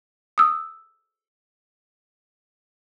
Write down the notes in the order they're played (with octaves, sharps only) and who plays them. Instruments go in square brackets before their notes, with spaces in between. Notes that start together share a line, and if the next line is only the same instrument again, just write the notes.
[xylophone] D#6 E6